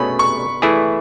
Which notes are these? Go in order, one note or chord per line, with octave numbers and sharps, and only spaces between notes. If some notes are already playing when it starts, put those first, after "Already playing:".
Already playing: B2 A3 C#4 G#4 C#5 B5
C#6
E3 A3 E4 G#4